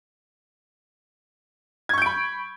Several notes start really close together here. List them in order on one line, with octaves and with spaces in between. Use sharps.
G#6 C#6 G6 D7 B5